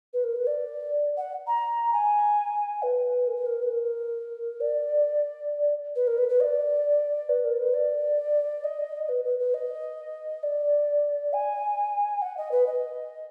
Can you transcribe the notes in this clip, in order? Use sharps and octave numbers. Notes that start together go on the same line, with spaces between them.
B4
A#4
B4
D5
F#5
A#5
G#5
B4
A#4
B4
A#4
B4
A#4
D5
B4
A#4
B4
B4
D#5
D5
B4
A#4
B4
D5
D#5
B4
B4
B4
D#5
D5
G#5
F#5
D#5
B4
D#5